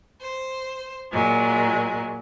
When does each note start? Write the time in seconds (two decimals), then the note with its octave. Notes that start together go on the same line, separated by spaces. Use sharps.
0.21 C5
1.12 A#2 F#3 G#3